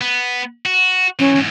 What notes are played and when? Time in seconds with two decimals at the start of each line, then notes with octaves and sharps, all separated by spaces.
0.01 B3
0.65 F#4
1.19 E3 F#3 C#4
1.35 E2 G#2